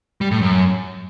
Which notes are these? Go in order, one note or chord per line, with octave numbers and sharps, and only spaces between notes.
G3
A2
F#2